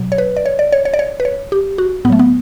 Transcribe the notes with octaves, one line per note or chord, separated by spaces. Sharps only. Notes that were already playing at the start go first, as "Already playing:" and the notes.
Already playing: B2 F#3
C#5
B4
D5
C#5
D5
C#5
C#5
D5
C#5
B4
C#5
G4
F#4
A2 F#3 A3 B3
B3